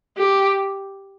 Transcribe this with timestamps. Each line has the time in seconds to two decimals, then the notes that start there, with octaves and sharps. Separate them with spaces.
0.18 G4